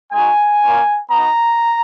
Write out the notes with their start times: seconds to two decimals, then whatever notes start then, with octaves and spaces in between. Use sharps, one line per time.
0.13 G#3 D#4 F#4 G#5
0.63 A#3 C#4 F4
1.11 B3 D#4 F#4 A#5